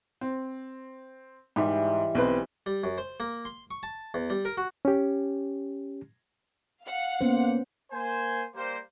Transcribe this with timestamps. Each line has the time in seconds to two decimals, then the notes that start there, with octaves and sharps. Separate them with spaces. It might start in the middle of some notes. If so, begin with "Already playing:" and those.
0.21 C4
1.56 G#2 E3 G3
2.15 B1 C4 B4
2.66 G3
2.84 F#2
2.98 C5
3.20 A#3
3.45 C6
3.71 C#6
3.83 A5
4.14 E2
4.30 G3
4.45 A#4
4.57 F#4
4.85 C#4 G4
6.82 F5 F#5
7.21 A#3 B3 C#4 C5
7.92 A#3 C5 G#5
8.54 G3 A#3 C5